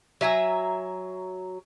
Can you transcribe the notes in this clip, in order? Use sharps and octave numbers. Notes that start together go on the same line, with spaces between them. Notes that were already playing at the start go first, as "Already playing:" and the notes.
F#3 E5 G#5 A#5